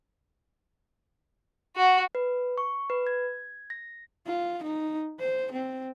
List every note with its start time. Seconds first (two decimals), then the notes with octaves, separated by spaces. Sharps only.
1.76 F#4
2.15 B4
2.58 C#6
2.90 B4
3.07 G#6
3.70 A#6
4.27 F4
4.64 D#4
5.20 C5
5.52 C4